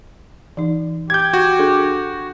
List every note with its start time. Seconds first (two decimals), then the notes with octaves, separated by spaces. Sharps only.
0.57 E3 D#4
1.10 G4 G6 G#6
1.33 F#4
1.59 D4 G#4 A4